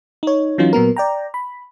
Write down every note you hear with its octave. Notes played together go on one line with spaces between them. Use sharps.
D#4 C#5
E3 F#3 C#4 D#4 F4
A#2 F#3 B3 A#4
D5 G5 A#5
B5